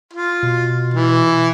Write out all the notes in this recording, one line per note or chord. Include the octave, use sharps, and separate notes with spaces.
F4
B2
E3